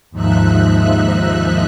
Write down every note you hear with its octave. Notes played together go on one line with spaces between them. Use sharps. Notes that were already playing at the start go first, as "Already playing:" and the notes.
D#2 G#2 F3 D#4 E5 F#6